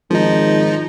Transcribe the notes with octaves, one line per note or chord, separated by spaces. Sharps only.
G#1 F3 D#4